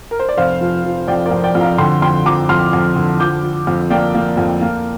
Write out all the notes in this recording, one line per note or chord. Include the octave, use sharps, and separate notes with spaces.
A#4
C5
D5
F1 C5 F5
F3
F3
F2 D5 G5
A#4 D5
F2
D5 G5
F2
F5 A#5
D3 G5 C6
F2 G5 C6
F2 A#5 D6
F2 C6 F6
F2
D3
F3 D6 G6
F3
F2
A#3 D5 G5
A#3
F2
A#3